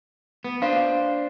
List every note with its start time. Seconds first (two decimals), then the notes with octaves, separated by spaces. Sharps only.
0.44 B3
0.62 D4 C5 F5